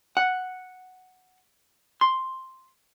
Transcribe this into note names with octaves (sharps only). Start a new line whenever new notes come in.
F#5
C6